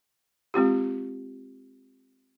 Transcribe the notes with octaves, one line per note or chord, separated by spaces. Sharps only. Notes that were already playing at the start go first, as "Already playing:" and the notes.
G#3 C4 F4 G4